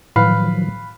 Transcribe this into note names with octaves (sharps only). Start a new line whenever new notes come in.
A2 D#3 F3 F#3 B4 F5